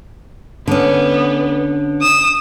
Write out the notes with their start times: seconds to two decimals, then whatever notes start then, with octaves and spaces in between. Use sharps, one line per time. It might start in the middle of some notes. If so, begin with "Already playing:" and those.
0.67 D3 B3 C#4
2.01 D#6 E7